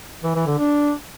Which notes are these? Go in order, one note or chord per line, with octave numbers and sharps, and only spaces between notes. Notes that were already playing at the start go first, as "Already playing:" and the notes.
E3
E3
D3
D4